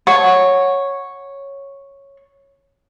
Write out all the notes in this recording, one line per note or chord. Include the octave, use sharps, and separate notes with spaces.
C#5 F#5 A5